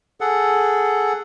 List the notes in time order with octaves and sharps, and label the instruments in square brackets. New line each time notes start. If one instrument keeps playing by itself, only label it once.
[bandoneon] G#4 A4 F#5